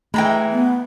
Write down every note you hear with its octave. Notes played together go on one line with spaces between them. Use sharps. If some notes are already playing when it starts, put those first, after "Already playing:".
E3 G#3 A3 G5 A#5 B5
B3